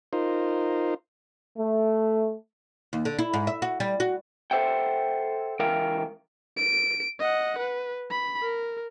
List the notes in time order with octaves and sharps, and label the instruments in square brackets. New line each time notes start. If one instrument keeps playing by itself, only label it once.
[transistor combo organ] D#4 F4 A#4 C5
[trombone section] A3
[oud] D#2
D3
E4
G#2
E5
F#4
G3
F#4
[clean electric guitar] A4 B4 C5 E5 F#5 G5
C#2 E3 A#4 E5 F5 G5
[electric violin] D7
D#5 F#5
B4
B5
A#4